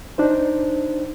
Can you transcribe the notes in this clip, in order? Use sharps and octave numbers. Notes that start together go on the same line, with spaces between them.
D4 D#4 C5